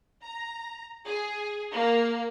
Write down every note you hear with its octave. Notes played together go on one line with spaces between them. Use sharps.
A#5
G#4
A#3